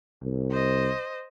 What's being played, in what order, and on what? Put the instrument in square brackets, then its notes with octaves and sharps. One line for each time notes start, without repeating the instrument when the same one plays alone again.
[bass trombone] C2
[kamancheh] C5 D#5